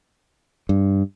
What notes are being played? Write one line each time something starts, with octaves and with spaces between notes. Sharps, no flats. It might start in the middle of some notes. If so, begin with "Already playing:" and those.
G2